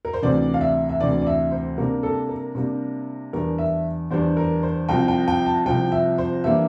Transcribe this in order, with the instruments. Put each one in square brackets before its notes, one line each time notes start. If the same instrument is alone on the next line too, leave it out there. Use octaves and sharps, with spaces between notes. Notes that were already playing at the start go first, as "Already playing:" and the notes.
[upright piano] A#4
C5
D2 C3 E3 D5
F5
E5
E5
D2 C3 E3 D5
D5
E5
C5
C3 G3 A#3 D4 A#4
A4
A#4
C3 G3 A#3 D4
E2 E3 G3 D4 A#4
E5
E2 E3 G3 D4 C5
A#4
C5
C2 C3 F3 G5
G5
G5
A5
C2 C3 F3 G5
E5
C5
E3 G3 A#3 D4 E5